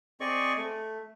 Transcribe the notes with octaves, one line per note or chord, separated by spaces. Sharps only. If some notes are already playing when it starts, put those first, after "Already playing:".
C4 G#4 D5 D#5 C#6
A3